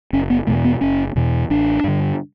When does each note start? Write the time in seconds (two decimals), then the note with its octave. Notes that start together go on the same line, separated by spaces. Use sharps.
0.13 F#1 C#4
0.30 B3
0.47 E2 B2 A3
0.65 B3
0.81 F#1 C#4
1.16 E2 B2
1.50 A1 D4
1.84 G2 D3